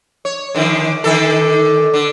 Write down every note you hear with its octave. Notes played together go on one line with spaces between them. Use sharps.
C#5
D3 D#3 F3
D3 D#3 A4
D3